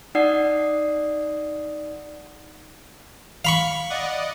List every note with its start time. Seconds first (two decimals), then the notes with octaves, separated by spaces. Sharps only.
0.15 D#4 D5 F#5 D#6 C7
3.45 F5 B5 C#6
3.90 D5 D#5 F#5